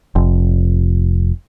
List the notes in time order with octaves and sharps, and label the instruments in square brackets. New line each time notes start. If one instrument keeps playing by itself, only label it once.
[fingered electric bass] F1